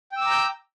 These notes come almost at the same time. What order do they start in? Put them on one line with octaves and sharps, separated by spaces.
G5 E6 D6 A#5 G6